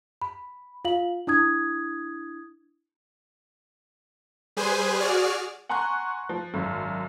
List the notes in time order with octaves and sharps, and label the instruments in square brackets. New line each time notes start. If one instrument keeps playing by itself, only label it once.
[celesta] B5
F4 F5 F#7
D4 E4 D#6 G#6
[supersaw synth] G3 G#4 B4 C5 G#5
F#4 G#4 D5 F6
[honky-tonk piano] F#5 G#5 A#5 C6 C#6 F#6
F3
G#1 F#2